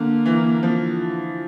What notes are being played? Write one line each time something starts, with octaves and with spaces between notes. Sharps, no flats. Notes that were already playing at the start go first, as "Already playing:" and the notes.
Already playing: D3 A#3
E3
F3